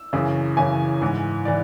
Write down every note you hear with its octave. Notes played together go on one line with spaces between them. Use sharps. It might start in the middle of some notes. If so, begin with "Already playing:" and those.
Already playing: E6
F#2 C#3 E3
F#2 C#3 E3 G#5
G#2 E3
E3 D5